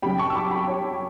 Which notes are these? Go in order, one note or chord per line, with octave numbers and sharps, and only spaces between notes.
F#2 C#3 G3 G5 B5
A5 C#6
E6
B5 D6
G5 B5
C#5